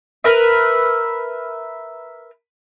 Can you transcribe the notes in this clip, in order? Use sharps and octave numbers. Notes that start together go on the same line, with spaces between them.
A#4 B4 E5